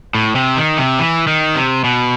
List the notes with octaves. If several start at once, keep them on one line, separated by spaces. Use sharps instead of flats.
A2
C3
D#3
C3
E3
D#3
C3
B2